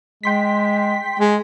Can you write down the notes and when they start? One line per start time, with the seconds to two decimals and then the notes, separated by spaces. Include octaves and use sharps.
0.23 G#3 G5 C6 B6
1.20 G#3